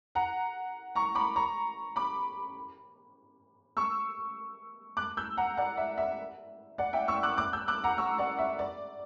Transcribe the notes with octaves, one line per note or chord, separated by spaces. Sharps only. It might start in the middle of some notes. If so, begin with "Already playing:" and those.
F#5 A#5
A#5 C#6
B5 D6
A#5 C#6
B5 D6
C#6 E6
D6 F#6
E6 G6
F#5 A#5
D5 F#5
E5
E5
D5 F#5
E5 G5
C#6 E6
D6 F#6
D6 F#6
E6 G6
D6 F#6
F#5 A#5
C#6 E6
D5 F#5
E5
D5